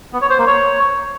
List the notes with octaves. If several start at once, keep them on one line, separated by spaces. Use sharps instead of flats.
B3
C#5
C5
A#3
C#5